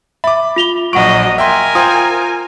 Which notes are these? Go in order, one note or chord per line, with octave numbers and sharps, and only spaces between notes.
E5 B5 D6
F4 F7 G7
A#1 F#3 D#5 F#5 C#6 D7
A#4 E5 G5 G#5 C6
F4 C5 G5 D#6